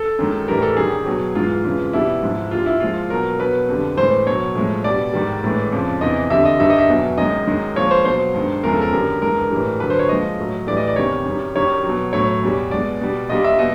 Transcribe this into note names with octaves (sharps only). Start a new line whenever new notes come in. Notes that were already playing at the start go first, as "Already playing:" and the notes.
Already playing: A4
F#2 D#3 G#3
A2 E3 G3 A#4
A4
F#2 D#3 G3 G#4
B2 F#3
G#2 E3 G#3 F4
F2 C#3 E3 G#3
B2 G3 E4
G#2 F3 G#3
A#2 G3 F4
E4
A#2 F3 G#3 F4
B2 F#3 A#4
B2 F#3 B4
F2 D3 G3
A2 E3 G#3 C5
B2 F#3 C#5
A2 F3 G#3
B2 G3 D5
G#2 D#3 G3
A2 E3 G#3
F2 C#3 F3
E2 C3 E3 D#5
F2 D3 G3 E5
D#5
G2 D#3 G3 E5
D#5
E5
E2 B2 F#3
F#2 D#3 G#3 D#5
F#2 D#3 G#3
A#2 F3 G#3 C#5
C5
B2 F#3 C5
G2 D#3 G#3
E2 C#3 F3 G#3 A#4
A4
A#4
F#2 D3 G3
G2 E3 G#3 A#4
A2 E3 G3
G2 D3 F#3 B4
C5
C#5
A#2 F3 G#3 D#5
A2 F#3
A2 E3 G3 D5
D#5
D5
E2 C3 D#3 G3 C#5
F#2 D#3 G3
F#2 D#3 G3 C#5
F#3
B2
A2 F#3 C#5
E2 B2 G3
B2 G#3 D5
B2 G3
A#2 G3 D#5
E5
B2 D#5